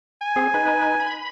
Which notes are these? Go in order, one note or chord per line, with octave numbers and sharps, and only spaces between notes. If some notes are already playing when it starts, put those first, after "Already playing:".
G#5
C4 G#4
D#4 B4
B5